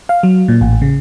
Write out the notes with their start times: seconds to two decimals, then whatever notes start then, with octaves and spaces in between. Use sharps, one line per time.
0.09 F5
0.23 F#3
0.48 A#2
0.61 A1
0.82 C#3